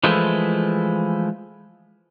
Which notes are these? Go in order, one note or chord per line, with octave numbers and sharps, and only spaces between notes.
E3 F3 G#3 A3 E4